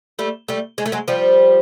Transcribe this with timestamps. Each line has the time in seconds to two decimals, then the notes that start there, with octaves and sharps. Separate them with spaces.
0.19 G3 A3
0.48 G3 A3
0.78 G#3
0.86 A3
0.92 F#3 G#3
1.08 F3 G3